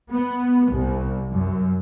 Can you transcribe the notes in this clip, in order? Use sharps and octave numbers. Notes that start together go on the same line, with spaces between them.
B3
C2
F#2